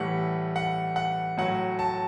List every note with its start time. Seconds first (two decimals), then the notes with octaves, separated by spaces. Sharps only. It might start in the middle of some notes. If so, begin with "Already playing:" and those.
Already playing: A2 E3 G3 F#5
0.56 F#5
0.96 F#5
1.37 A2 F#3 F#5
1.79 A5